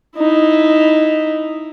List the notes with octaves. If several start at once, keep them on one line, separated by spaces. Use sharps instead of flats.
D#4 E4